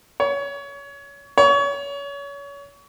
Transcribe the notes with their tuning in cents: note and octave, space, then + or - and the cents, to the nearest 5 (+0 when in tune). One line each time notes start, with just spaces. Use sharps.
C#5 +25
C#5 +30